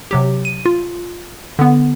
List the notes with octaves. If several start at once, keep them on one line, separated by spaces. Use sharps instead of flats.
C3 F#3 G4
D#7
F4
D3 B3